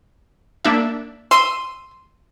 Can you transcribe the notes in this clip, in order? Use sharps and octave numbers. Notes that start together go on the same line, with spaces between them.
A#3 D4 E5
C6 E6 D#7